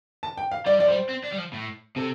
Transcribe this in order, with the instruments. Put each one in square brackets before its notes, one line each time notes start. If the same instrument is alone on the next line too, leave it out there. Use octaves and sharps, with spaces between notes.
[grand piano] A5
G5
F5
[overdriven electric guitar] G3 [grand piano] D5
[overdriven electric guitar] F3 [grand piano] D5
[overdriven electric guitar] G3 [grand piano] C5
[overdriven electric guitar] C4
D4
G3
F3
A2
[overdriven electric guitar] C3 [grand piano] A4